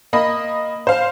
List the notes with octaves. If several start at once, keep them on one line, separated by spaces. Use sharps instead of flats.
A#3 D#5 B5
C5 F5